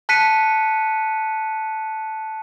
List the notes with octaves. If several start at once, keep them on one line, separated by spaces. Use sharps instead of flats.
A5 F#6 B6 C#7 D#7